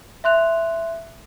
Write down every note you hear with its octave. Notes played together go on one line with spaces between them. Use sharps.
E5 C6 F#6 F7